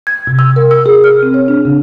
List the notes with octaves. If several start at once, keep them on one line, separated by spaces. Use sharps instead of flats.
G#6
C3
E6
A#4
E6
G#4
F6
C4
C#5
D4
C#3